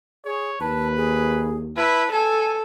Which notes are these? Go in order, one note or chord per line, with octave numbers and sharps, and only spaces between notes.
G#4 C#5
D#2 B4 A5
G#4
E4 B4 A5
A4 G#5